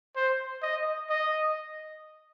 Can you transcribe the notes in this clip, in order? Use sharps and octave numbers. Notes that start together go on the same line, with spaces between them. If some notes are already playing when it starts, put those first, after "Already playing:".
C5
D#5
D#5